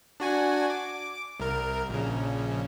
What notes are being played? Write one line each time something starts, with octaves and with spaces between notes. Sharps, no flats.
D4 F#4 G#5
D6
C2 A#4
A#1 C#3